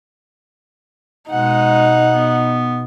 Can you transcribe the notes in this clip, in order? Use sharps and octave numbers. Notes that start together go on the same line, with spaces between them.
B2 G#3 D#4 F#5
B3